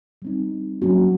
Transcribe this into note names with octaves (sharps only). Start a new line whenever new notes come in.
G3 C4 D#4
F#3 A#3 C#4 F#4